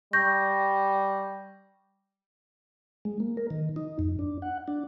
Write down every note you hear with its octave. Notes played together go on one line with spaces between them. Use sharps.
G3 C#6 G6 A#6
G#3
A#3
A#4
D#3
D#4
F2
D4
F#5
D4